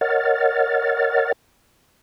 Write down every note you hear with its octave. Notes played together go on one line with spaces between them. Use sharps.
A#4 C#5 D#5 F#5 F6 A6